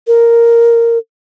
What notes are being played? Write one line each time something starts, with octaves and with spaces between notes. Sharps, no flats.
A#4